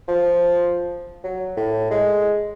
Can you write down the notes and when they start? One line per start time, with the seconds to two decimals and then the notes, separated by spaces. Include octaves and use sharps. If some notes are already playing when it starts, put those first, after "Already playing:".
0.08 F3
1.24 F#3
1.57 A2
1.91 G#3